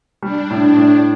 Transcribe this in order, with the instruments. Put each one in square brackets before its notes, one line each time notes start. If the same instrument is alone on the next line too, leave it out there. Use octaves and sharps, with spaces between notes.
[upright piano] G3 [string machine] D4
[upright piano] A2
A2